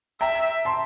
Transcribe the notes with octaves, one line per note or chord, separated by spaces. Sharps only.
E5 G5 A#5
A5 C6